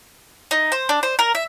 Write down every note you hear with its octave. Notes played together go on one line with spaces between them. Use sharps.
D#4
C5
D4
C5
A#4
E5